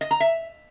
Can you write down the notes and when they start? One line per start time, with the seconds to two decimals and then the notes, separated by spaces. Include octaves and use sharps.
0.01 D#5
0.11 A#5
0.20 E5